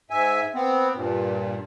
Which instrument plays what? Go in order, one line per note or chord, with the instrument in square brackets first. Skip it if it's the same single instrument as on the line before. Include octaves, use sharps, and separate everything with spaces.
[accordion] G#2 E5 G#5
B3 C4
G2 A#2